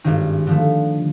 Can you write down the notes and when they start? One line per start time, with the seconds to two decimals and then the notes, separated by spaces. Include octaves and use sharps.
0.04 G#1 G2 D#3
0.47 D3 F3 A3